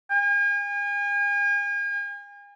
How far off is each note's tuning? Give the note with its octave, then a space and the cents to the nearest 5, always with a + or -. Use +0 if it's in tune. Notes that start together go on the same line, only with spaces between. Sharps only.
G#5 -40